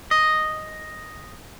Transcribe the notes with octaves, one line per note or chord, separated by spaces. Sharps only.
D#5